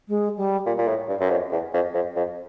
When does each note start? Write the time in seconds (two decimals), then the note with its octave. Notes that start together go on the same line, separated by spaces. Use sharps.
0.08 G#3
0.37 G3
0.66 A#2
0.78 A#2
0.88 A2
1.09 G2
1.21 F#2
1.30 F2
1.52 E2
1.74 F2
1.94 F2
2.16 F2